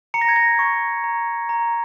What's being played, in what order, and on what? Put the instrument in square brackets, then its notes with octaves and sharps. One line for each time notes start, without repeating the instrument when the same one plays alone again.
[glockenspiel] A#5 C#7
A#6
G#6
A#6
C#6
A#5
A#5